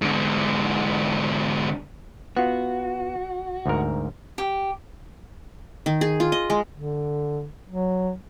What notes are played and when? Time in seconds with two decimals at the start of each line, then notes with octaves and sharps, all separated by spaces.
0.02 G#2 D3
2.37 B3 F4 F#4
3.66 D2 G#2 A#4
4.38 G4
5.86 D#3
6.01 G#4
6.20 F4
6.32 D#5
6.50 G#3
6.75 D3
7.69 F#3